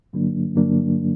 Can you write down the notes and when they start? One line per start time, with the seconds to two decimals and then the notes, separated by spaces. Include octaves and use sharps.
0.13 G2 D3 F#3 A#3 D4
0.56 G2 D3 F#3 A#3 D4